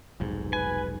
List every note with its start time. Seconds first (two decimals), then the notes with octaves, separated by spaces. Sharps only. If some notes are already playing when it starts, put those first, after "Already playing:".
0.20 F1 B1 G#2
0.53 B4 G#5